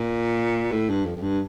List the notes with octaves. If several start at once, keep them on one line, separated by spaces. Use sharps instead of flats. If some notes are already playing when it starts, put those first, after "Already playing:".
Already playing: A#2
A2
G2
F2
F2
G2